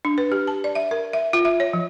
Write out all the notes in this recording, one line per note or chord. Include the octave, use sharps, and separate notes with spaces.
D4
B4
G4
A5
D5
E5
A#4
E5
F4
E5
C#5
F3